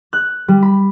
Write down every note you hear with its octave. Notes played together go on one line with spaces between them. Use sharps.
F#6
G3
B5